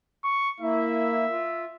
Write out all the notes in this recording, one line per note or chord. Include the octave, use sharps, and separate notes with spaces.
C#6
A#3 E4 E5
F4